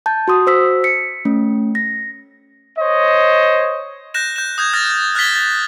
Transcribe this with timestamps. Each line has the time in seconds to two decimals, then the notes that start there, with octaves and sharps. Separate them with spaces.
0.06 A5 G6
0.28 F#4 C6 D#6
0.46 F#4 C5 E6 B6
0.84 B6 C#7
1.25 A3 C#4
1.75 A#6
2.79 C5 C#5 D#5
4.14 F#6 G6 A#6 E7
4.36 G6 E7
4.58 D#6 G6 G#6
4.73 F6 A6 A#6
5.15 F6 F#6 G#6 A6 B6 G7
5.36 A6